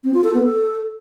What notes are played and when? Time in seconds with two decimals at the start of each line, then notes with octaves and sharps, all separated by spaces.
0.04 C4
0.14 F4
0.24 A4
0.34 B3
0.44 A4